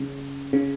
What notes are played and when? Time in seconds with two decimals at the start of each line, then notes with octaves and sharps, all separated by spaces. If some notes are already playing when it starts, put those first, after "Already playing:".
Already playing: C#3
0.53 C#3